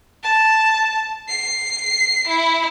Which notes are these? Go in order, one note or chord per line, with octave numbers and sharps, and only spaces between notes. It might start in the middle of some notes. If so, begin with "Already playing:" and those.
A5
C7
E4